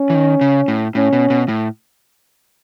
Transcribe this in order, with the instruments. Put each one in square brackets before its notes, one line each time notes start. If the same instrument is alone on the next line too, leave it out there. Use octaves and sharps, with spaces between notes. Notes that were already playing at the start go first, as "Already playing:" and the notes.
Already playing: [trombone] C#4
[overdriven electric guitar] E3
D#3
C#3
A2
[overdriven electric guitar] A2 [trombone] C#4
[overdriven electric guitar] B2
B2
A2